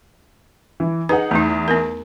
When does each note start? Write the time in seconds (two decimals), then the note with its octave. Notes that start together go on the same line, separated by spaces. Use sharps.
0.80 E3
1.09 D#4 G#4 B4 F#5
1.31 E2 A3 D#4
1.68 B3 A#4